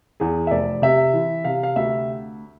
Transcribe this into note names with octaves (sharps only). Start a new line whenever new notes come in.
E2 G#4
E5
F1 D5
C3 E5
E3
C3 F5
F5
D2 E5